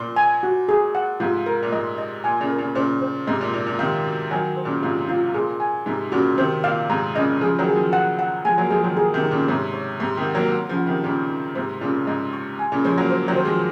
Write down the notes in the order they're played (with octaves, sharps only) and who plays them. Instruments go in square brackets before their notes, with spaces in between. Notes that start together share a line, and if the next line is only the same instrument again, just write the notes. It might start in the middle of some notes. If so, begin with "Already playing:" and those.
Already playing: [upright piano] A#2 [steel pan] C6
[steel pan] G#5
F#4
G#4
F#5
[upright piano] G#2 C3 [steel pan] F4
[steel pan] A#4
[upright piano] A#2
[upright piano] G#2 [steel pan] D#5
[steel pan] D#5
[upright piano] A#2 [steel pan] G#5
[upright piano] A#2 C#3
[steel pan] A#4
[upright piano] A#2 C#3
[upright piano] A#2 C#3 [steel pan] C5
[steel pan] C5
[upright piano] G#2 C3 [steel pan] D#5
[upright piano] A#2
[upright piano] A#2 [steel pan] D#4
[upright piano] A#2
[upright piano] C3 D#3 [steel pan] F5
[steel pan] F#4
[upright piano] D#3 F#3 [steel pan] G#5
[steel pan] C5
[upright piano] A#2 C#3
[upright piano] G#2 C3 [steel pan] F4
[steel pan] F4
[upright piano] A#2 [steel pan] G#4
[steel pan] G#5
[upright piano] G#2 C3 [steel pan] D#4
[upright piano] A#2 C#3 [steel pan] F#4
[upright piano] C3 D#3 [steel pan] C5
[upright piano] A#2 [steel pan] F5
[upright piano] G#2 C3 [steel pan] A#5
[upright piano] A#2 C#3 [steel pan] D#5
[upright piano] C#3 F3 [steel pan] G#4
[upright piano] D#3 F#3
[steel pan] G#4
[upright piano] F3 G#3
[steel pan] F#5
F#5
[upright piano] F3 G#3 [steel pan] G#5
[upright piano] F#3 A#3
[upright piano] F3 G#3 [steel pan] G#4
[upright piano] D#3 F#3
[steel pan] G#4
[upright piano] C3 D#3
[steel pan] D#4
[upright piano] A#2 C#3
[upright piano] G#2 C3 [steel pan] C#5
[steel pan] C#5
[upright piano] G#2 C3 [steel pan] C#6
[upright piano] C3 D#3
[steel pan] F#5
[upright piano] F#3 A#3
[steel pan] F#5
[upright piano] C#3 F3
[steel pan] F#5
[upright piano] C3 D#3
[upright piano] A#2 C#3 [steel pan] A#4
[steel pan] D#4
[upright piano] G#2 C3 [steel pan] C5
[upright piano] A#2 C#3 [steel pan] F4
[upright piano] G#2 [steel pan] D#5
[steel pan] C#6
G#5
[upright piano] A#2 C#3
[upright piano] F3 G#3 [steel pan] C#5
[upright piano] F#3 A#3
[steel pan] C5
[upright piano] D#3 F#3
[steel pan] C5
[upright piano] F3 G#3